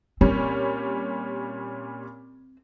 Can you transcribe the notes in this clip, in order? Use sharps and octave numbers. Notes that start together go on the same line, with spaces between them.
A#2 G3 C4 C#4